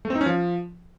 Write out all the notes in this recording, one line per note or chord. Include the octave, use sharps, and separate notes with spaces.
A3
C4
D#4
C#4
F3